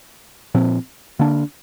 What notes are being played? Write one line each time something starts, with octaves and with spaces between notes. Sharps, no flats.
A#2 F3 C4
D3 A#3 D4